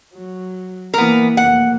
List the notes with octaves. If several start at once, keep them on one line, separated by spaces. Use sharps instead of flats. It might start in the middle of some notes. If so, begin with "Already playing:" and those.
F#3
E3 A#3 B3 A#4
F1 A#3 F#5